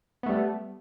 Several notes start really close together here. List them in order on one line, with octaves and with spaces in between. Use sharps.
B3 A3 G3